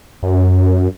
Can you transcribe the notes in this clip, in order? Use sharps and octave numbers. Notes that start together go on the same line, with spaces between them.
F#2